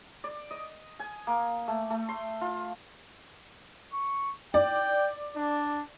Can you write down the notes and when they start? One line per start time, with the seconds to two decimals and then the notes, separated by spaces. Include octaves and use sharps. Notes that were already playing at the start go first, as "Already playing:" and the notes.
0.24 D5
0.51 D#5
1.00 G#5
1.27 A#3
1.68 A3
1.90 A3
2.09 C6
2.41 F4
3.93 C#6
4.54 D5 G5
5.36 D4